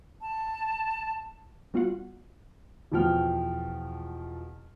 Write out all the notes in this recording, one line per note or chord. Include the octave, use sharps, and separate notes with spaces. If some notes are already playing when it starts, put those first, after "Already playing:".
A5
G3 B3 F4 F#4 F5 F#5
E2 B2 F3 G5 F6